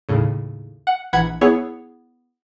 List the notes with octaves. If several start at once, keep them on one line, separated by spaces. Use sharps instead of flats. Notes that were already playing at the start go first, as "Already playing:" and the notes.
D#2 A2 C#3
F#5
A#1 E3 F#5 B5 G#6
B3 E4 G#4 C#5